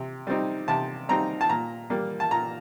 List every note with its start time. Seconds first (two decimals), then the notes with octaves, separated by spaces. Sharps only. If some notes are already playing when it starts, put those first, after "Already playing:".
Already playing: C3
0.27 G3 C4 D#4
0.68 C3 A5
1.09 G3 C4 D#4 A#5
1.41 A5
1.49 A#2 A#5
1.90 G3 A#3
2.20 A5
2.31 A#2 A#5